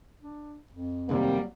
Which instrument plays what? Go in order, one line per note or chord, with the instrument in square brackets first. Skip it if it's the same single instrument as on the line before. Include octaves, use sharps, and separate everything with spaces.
[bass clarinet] D4
F2
[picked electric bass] F1 D#2 C3 [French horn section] F#3 G3 A#3